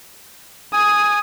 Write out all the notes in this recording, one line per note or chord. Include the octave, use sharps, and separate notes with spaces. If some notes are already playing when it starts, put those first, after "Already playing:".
G#5 D#6